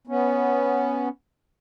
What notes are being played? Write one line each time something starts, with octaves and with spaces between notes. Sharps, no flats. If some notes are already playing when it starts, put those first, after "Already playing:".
B3 C#4